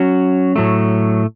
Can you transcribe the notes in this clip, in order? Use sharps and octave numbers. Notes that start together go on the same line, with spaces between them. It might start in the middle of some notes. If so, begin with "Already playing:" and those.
Already playing: F#3 C#4 F#4 C#5
A2 F#3 A3